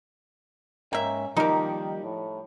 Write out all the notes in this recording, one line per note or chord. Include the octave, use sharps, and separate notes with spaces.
G#2 A#3 C#4 E5 G5
D#3 F3 G3 A#3 D#4 A#4
A2